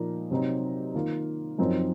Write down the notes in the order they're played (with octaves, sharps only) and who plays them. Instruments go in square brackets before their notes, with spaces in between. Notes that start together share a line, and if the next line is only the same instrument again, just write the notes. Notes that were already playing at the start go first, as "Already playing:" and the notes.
Already playing: [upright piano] A#2 F3 A#3 D#4
C3 F#3 C4 D#4
D#3 A#3 F4
F#2 F3 C4 D#4